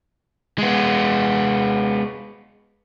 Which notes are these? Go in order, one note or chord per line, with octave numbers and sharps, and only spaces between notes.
G#3 B3